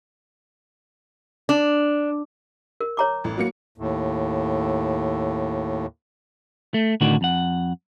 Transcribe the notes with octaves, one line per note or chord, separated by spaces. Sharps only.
D4
A#4
C#5 A#5 D6
A1
F#3 A#3 C#7
D#2 A2
A3
A2 D3 D#3 D4 F#4
F2 F#5